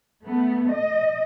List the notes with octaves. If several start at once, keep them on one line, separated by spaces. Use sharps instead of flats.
A3 B3
D#5